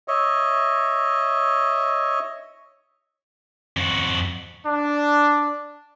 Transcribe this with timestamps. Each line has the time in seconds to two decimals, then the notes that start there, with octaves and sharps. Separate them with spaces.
0.08 C#5 D#5 E5
3.77 F2 F#4
4.64 D4